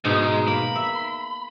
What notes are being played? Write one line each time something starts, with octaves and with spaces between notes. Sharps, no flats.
G#2 B2 G#3 D#4
A#3 B5
E5